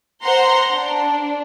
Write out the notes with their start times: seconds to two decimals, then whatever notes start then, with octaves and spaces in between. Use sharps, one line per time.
0.22 C5 F#5 A#5 C6
0.72 D4